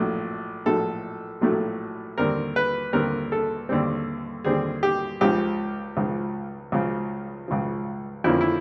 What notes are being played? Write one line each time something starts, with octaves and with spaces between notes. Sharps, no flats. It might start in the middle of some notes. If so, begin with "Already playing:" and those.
Already playing: A#1 A2 F#3 A3
A#1 A2 F#3 A3 A4
A#1 A2 F#3 A3
D#2 D3 G3 C4 A#4
B4
D#2 D3 G3 C4 A#4
A4
D#2 D3 G3 C4
D#2 D3 G3 C4 G#4
G4
C#2 C#3 F3 G4
C#2 C#3 F3
C#2 C#3 F3
C#2 C#3 F3
F2 D3 F3 A#3 C#4 E4
E4